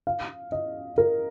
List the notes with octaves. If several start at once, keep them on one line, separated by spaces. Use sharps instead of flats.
F5
D#5
A#4